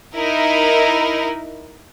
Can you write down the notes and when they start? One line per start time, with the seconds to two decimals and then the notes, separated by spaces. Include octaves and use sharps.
0.15 D#4 E4 A#4